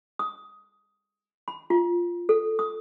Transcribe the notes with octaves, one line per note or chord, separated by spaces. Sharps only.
D#6
B5
F4
A4
D#6